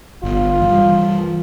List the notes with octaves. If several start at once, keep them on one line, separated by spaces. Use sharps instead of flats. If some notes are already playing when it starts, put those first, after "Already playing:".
G1 F4
E3 F3 G3